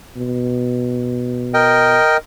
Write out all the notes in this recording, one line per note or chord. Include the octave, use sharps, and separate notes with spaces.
B2
A#4 D#5 G5